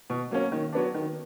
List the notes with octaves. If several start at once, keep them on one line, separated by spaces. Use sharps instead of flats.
B2
F#3 A#3 C#4
D#3
F#3 B3 D4
D#3